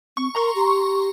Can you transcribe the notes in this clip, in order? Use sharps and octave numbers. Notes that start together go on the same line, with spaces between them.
C4 C#6
A#4 A#5 C6 C#6
G4